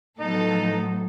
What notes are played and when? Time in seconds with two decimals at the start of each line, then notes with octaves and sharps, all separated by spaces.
0.20 A2 F3 F#3 B3 D#4 A4